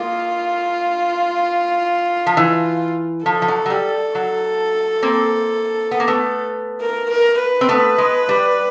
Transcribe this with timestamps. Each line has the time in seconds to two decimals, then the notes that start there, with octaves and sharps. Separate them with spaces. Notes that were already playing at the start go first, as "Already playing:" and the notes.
Already playing: G#3 A#3 F4
2.27 F3
2.37 E3
3.26 F3 A4
3.42 F3
3.48 F#3
3.66 F#3
3.70 G3
4.15 F#3
5.03 A#3 C4
5.91 B3
6.00 A#3
6.07 A3 B3
6.81 A#4
7.10 A#4
7.40 B4
7.61 C4
7.69 A3 B3
7.98 G#3
8.29 G3